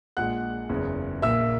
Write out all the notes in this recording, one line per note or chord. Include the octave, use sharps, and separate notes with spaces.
A#1 A#2 G#3 F#5 F#6
F#1 E2 C#3
A#1 A#2 A#3 E5 E6